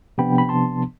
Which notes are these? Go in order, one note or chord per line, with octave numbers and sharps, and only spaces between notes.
C3 F3 B3 D4 G5 B5
B5
A5 C6